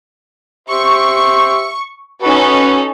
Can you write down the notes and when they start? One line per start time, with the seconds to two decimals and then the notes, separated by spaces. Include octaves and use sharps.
0.69 G4 C5 E5 C#6
2.22 C#4 D#4 F#4 A4 B4